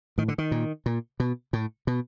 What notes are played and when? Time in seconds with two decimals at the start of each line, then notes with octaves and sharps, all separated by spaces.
0.18 A2 D#3
0.28 D3
0.38 D#3
0.52 A#2
0.86 A#2
1.20 B2
1.53 A2
1.87 B2